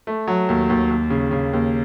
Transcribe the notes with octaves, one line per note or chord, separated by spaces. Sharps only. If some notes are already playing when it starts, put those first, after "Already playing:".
A3
F#3
D#2
D#2
D#2
C#3
C#3
D#2